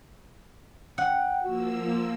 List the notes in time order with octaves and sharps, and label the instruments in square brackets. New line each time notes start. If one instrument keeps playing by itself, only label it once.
[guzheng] F#5 [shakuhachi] G5
[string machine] F3 A#3 E6 [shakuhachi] F#4
[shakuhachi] F4